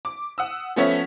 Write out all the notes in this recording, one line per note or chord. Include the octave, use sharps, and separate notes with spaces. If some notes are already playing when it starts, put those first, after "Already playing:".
D6
F#5 D#6 E6
F3 A3 B3 C#4 C#5 E5